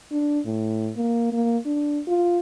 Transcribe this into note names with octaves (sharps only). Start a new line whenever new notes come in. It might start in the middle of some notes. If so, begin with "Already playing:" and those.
D4
A2
A#3
A#3
D4
F4